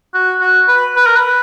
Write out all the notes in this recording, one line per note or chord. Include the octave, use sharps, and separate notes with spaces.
F#4
F#4
B4
B4
A#4
B4